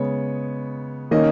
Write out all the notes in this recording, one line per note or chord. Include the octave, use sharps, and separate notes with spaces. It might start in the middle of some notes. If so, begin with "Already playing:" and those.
Already playing: C#3 G#3 B3 C#5
D#3 A#3 C#4 D#5